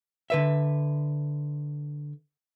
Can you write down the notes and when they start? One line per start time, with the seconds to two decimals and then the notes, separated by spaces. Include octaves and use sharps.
0.30 D3 B4 E5